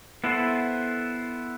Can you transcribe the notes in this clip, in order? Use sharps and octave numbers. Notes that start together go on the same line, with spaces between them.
B3 E4 A4 C5